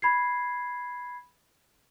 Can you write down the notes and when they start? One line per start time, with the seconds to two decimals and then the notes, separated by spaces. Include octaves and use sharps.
0.02 B5 G#6 C7